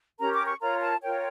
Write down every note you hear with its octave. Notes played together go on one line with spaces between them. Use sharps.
C#4 G4 A#4 A#5
D6
C#6
F4 A#4 C#5 A#5
A5
F4 A#4 C#5 G5